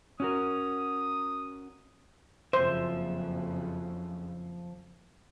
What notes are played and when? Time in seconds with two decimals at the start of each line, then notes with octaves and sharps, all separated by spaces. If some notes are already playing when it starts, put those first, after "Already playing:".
0.20 C#4 F#4 A#4 D#6
2.53 F#1 F2 C#3 F3 C5 E5